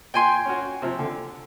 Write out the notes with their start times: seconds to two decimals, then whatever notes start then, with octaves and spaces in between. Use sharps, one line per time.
0.14 A#2 G5 G#5 C6
0.45 C#4 F#4
0.82 C3 F3
0.99 D3